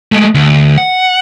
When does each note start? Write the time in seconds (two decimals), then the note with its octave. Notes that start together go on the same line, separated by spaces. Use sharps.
0.12 G#3 A3
0.35 D2
0.78 F#5